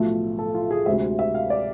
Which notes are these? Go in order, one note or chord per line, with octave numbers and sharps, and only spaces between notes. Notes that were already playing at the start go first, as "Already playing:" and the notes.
Already playing: B1 A2 F3 A3 F4
A4
F4
G#4
D2 C3 G#3 E5
E5
F5
D5